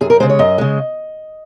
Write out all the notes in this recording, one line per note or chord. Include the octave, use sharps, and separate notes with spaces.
F#2 G#4
A#4
C#3 G#3 C5
C#5
F#2 D#5
C#3 G#3